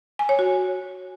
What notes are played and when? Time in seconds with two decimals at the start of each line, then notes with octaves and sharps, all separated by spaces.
0.19 G#5
0.29 C#5
0.39 F#4